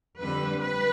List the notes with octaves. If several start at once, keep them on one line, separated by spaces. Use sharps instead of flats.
F2 D3 G3 B4
B4